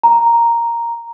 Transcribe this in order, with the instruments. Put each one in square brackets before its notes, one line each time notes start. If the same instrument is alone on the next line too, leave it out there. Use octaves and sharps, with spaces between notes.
[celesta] A#5